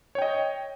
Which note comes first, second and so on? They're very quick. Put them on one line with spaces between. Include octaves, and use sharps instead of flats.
C#5 G5 D#5